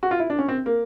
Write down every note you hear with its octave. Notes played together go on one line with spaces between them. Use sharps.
F#4
F4
E4
D4
C#4
C4
A#3